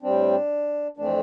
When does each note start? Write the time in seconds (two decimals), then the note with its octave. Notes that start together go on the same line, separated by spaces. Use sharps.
0.02 A2 G3 C4 D4
0.97 F2 E3 A3 C4 D4